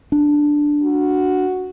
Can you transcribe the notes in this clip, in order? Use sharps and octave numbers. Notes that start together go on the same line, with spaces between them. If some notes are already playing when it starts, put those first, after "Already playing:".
D4
F#4